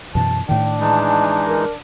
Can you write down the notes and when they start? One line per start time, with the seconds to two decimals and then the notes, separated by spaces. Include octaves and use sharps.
0.15 F#2 B2 E3 A5
0.49 A2 D#3 D4 G5
0.80 E3 G#3 D#4 A5
1.47 A#4